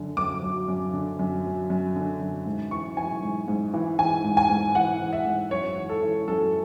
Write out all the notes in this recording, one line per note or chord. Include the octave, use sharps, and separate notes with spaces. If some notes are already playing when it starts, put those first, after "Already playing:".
Already playing: F#2 D3
F#2 D6
F#3
F#2
D3
F#2
F#3
F#2
D3
F#2
G#2
E3 C#6
E3 G#5
G#2
G#2
E3
E3 G#5
G#2
G#5
G#2
E3 F#5
E3
E5
G#2
F#2 C#5
E3
A4
E3
F#2 A4